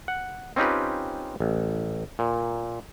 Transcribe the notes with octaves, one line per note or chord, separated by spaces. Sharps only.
F#5
C4 C#4 D#4 F4 G4 B4
A1
A#2